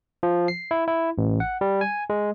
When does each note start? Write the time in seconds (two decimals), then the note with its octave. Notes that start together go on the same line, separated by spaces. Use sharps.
0.23 F3
0.48 C7
0.71 E4
0.88 E4
1.18 A1
1.40 F#5
1.61 G3
1.81 G#5
2.10 G#3